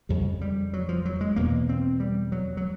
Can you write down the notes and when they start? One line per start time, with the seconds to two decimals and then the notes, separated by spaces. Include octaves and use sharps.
0.09 F2 C#3 G3
0.41 G3
0.73 F#3
0.89 F3
1.05 F#3
1.21 G#3
1.36 E2 B2 A#3
1.69 C4
2.00 G3
2.32 F#3
2.57 F#3